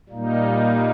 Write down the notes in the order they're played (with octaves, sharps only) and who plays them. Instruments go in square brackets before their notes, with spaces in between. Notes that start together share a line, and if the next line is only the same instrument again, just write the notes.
[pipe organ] A#2 G3 A#3 D#4